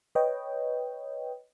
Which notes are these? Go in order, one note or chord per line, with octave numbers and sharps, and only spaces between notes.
B4 C#5 D#5 G5